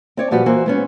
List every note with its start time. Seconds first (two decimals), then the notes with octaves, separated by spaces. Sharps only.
0.17 C4 C#5 D5
0.31 A#2 F3 G3 F#4 G4 B4
0.46 E3 A#3 F4 F#4 C5
0.66 G#3 B3 C#4